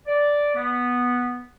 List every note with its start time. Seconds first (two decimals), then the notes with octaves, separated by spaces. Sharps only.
0.07 D5
0.55 B3